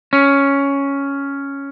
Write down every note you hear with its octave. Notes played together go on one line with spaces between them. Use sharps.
C#4